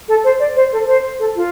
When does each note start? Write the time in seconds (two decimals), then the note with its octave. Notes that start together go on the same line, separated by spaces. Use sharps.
0.08 A4
0.24 C5
0.40 D5
0.56 C5
0.72 A4
0.87 C5
1.20 A4
1.36 F4